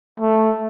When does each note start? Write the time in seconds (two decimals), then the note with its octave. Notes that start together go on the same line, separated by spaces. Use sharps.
0.20 A3